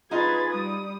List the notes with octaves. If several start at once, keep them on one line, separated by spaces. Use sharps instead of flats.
D#4 F4 G#4 B4 D#5 G#6 A6
G3 D#6